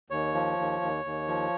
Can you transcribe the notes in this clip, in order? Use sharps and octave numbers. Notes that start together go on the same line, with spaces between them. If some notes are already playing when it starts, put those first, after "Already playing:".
D#2 C#5
F3
D#2
D#2
D#2
F3